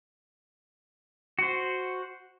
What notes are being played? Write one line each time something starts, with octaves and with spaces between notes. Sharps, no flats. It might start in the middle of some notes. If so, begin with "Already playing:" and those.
F#4 C5